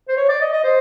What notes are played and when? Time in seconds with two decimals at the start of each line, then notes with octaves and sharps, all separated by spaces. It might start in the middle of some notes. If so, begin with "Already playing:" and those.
0.08 C5
0.17 C#5
0.29 D5
0.41 D#5
0.53 D#5
0.64 C5